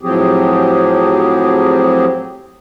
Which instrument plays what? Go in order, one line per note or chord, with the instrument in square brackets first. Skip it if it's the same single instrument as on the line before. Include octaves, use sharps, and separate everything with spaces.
[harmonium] A2 F3 F#3 C4 G4 G#4